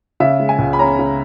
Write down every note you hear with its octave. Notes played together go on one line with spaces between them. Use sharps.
C#3 E5
G#3
G#5
C#2
B5
C#4 A#5
C#3